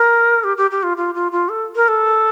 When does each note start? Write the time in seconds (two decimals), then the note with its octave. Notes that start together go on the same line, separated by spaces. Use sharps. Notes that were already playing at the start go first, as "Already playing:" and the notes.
Already playing: A#4
0.44 G4
0.57 G4
0.71 G4
0.83 F4
0.97 F4
1.15 F4
1.32 F4
1.49 A4
1.76 A#4
1.88 A4